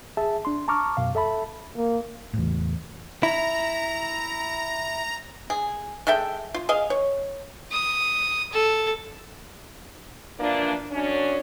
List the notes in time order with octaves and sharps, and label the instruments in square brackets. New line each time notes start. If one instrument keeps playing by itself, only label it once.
[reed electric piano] G#4 E5 A5
D4 C6
A5 A#5 C#6 D6 F6
F#2 B2 F5
A4 E5 A5 B5
[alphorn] A#3
[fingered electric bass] E2 A2
[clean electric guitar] E4 [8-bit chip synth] A#5
[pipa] G#4
G#3 A4 E5 G5
F4
G#4 D#5 F5
C#5
[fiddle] D#6
A4
[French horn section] E3 F3 A#3 D4
F#2 C#4 D4